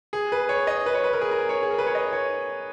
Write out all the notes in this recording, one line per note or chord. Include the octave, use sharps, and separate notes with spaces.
G#4
B4
C#5
D#5
B4
C#5
B4
A#4
G#4
A#4
C#5
G#4
A#4
B4
C#5
D#5
C#5